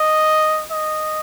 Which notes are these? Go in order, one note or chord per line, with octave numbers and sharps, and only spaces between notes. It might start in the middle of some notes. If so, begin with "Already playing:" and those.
Already playing: D#5
D#5